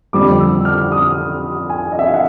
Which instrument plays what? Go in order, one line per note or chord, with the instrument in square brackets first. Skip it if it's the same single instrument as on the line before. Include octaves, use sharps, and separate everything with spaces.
[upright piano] F2 D3 G3 D6
E6
F6
D#6
G#5
D#5
E5
F5
F#5